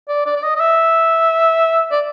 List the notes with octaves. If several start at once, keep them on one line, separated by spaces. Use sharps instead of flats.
D5
D5
D5
D#5
D#5
E5
D5